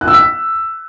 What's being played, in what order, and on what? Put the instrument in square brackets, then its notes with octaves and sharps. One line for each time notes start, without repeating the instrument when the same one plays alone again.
[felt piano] F#6
E6
B6